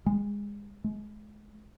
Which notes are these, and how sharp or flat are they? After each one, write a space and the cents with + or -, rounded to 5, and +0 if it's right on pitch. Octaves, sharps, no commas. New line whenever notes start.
G#3 -25
G#3 +35